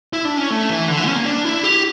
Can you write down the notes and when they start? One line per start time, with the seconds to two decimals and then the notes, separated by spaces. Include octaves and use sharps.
0.13 E4
0.25 D4
0.37 C#4
0.50 A3
0.70 E3
0.88 D3
0.97 E3
1.07 C#4
1.16 A#3
1.25 D4
1.45 E4
1.63 G4